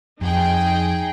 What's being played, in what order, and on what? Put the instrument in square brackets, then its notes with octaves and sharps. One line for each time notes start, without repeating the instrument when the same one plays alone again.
[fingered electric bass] F2 [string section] D#4 G#4 G5